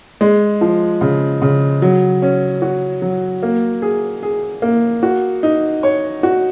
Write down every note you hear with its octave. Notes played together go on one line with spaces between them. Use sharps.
G#3
F3
C#3
C#3
F#3
C#4
F#4
F#3
A#3
G#4
G#4
A#3
F#4
D#4
C#5
F#4